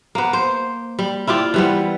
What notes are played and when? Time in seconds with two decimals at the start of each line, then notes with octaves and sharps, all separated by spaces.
0.15 A#3 B3
0.33 C5
0.99 G3
1.27 E4 F4 G4 D5
1.54 E3 G3 B3